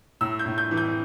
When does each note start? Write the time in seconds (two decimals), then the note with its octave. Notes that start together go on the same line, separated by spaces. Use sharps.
0.21 A2 E6
0.39 G6
0.46 A2
0.58 G6
0.71 E3
0.77 G6